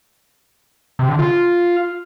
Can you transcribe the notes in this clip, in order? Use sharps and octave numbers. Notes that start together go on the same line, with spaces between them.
C3
D3
F4